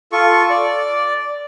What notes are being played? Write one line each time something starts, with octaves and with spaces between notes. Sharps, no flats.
F4 A4 C#6
D5